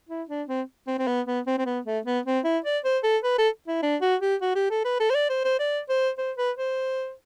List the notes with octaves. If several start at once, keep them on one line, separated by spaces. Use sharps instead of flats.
E4
D4
C4
C4
C4
B3
B3
C4
C4
B3
A3
B3
C4
E4
D5
C5
A4
B4
A4
E4
D4
F#4
G4
F#4
G4
A4
B4
A4
C5
D5
C5
C5
D5
C5
C5
B4
C5